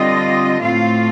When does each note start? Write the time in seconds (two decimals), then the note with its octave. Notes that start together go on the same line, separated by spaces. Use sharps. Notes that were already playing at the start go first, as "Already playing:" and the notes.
Already playing: D3 G3 C4 F4 D#5
0.61 A2 A3 C4 F4 F5